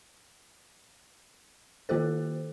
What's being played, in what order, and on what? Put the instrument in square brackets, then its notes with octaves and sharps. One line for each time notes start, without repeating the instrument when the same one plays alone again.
[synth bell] D#3 A#3 F4 G4 A4 C5